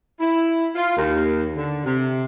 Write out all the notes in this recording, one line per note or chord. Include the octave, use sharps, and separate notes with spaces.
E4
F4
D#2
D3
C3